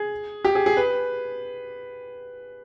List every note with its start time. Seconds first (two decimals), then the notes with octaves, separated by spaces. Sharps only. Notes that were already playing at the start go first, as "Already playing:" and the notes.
Already playing: G#4
0.44 G4
0.55 G#4
0.66 G#4
0.77 B4